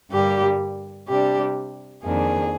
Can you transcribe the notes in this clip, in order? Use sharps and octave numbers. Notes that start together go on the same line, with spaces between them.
G2 D3 G3 A#3 G4
C3 G3 D4 G4
F2 D#3 A#3 D4 G#4